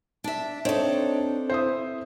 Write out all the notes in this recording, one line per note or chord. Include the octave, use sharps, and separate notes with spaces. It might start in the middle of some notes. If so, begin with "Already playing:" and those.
D4 E5
C4 D4 D#4 A4 C#5 E7
E4 C5 E5 D#6